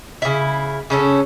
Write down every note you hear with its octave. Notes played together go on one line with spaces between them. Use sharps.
C#3 E4
C#3 C#4 A4